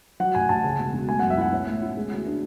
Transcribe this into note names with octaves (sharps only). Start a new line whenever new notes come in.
F#3 F#5
A1 G#5
A1 A5
C#3
E1
E1
A3 G#5
F#5
F#2
E5
E4 F#5
C#4
A2
E4
G#3
D2
D4